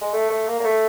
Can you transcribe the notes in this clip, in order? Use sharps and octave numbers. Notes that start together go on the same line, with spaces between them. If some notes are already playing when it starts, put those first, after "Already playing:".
G#3
A3
A3
A#3
A#3
A3